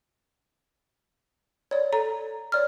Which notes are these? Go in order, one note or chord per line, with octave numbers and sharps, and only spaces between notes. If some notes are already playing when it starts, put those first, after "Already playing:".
C#5 D5
A4 A#5
C#5 D5 F6